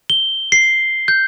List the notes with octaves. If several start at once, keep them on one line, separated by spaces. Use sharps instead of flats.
G7
C7
G6